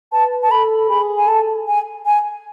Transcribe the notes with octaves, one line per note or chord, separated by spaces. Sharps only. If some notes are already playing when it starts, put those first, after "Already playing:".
B4 A5
A5
A4 B5
G#4 B5
G#5
A4 A5
G#5
G#5